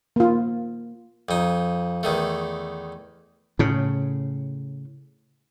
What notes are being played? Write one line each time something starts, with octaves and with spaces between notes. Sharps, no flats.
A#3 F4
F2 D#4
E2 D#3 A3
A2 C#3